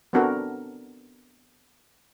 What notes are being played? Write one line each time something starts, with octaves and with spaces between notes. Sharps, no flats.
B3 C4 D4 F#4 A4 A#4